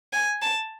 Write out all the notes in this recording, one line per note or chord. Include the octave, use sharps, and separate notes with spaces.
G#5
A5